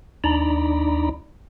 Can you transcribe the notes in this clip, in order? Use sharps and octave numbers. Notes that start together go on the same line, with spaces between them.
D#2 D4 D#4 D5 A#5 B5